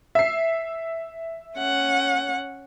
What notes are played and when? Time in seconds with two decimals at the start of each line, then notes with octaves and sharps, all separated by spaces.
0.15 E5 C7
1.58 C#4 F#5